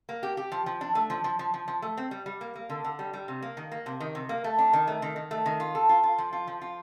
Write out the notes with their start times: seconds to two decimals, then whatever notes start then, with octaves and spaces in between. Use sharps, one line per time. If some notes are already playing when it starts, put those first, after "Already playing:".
0.09 A#3
0.23 G4
0.37 G4
0.52 F3
0.66 F3
0.81 D4
0.95 A3
1.10 F3
1.24 F3
1.39 F3
1.54 F3
1.68 F3
1.82 A3
1.97 C4
2.11 G3
2.26 G3
2.41 A#3
2.55 A#3
2.69 D3
2.84 D3
2.99 G3
3.13 G3
3.28 C3
3.42 A#3
3.57 D#3
3.72 A#3
3.86 C3
4.00 D#3
4.15 C3
4.29 A#3
4.44 A3
4.58 D4
4.73 D#3
4.87 A3
5.02 D#3
5.16 D#3
5.31 A3
5.46 D#3
5.60 F4
5.75 A4
5.89 F4
6.03 F4
6.18 F3
6.33 F4
6.47 F3
6.61 F4